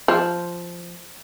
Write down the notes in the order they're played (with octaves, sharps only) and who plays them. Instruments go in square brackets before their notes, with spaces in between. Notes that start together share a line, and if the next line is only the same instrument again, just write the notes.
[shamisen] F3